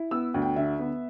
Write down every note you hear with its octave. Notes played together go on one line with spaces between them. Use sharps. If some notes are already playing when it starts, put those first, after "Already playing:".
Already playing: E4
B3 E6
D2
G5
D3 E5
B3